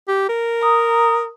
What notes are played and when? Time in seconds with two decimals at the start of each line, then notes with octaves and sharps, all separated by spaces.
0.08 G4
0.29 A#4
0.61 A#5 D#6